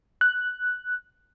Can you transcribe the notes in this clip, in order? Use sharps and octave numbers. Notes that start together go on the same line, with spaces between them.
F#6